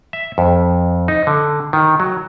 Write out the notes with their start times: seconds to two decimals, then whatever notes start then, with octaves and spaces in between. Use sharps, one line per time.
0.13 E5
0.38 F2
1.08 D#4
1.27 D3
1.73 D#3
2.00 F#3